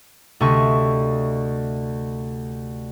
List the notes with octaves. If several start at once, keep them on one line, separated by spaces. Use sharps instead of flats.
D2 C3 A3 D#5 E5 C#6